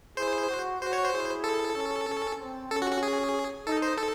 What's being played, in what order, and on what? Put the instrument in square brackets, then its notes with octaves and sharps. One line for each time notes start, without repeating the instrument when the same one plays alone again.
[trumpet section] E4 G#4 [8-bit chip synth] C5
[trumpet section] F#4
[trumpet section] F#4 [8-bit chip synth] C5
[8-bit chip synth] C#5
C5
[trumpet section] E4 G#4
[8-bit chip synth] A4
[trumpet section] C#4
C#4
C4
[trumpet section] C#4 [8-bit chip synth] A4
[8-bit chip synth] F#4
F#4
G#4
[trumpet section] D#4 [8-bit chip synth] A4
[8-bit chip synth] C5
A4